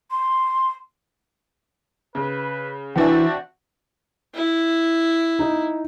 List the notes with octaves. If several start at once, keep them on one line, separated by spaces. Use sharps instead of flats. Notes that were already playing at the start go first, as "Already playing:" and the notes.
C6
C#3 B4
E3 C4 D4 F#4 E5
E4
D#4